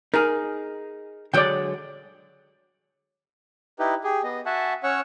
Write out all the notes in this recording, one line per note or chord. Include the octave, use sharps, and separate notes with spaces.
D#4 G#4 A#4
D3 F#3 G#3 D5 G5
D#4 E4 G4 B4
G4 G#4
B3 D#5
F#4 E5 F#5 G#5 A5
C#4 C#5 F#5 C#6 E6